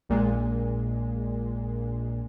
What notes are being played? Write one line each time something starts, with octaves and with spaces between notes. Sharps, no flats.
A#1 A#2 G#3